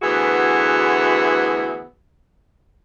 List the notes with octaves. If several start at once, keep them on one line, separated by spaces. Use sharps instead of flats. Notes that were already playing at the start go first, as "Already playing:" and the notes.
D2 E3 B3 E4 F#4 G#4